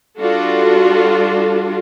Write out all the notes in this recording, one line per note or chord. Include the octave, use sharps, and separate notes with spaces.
G3 D4 F4 F#4 A4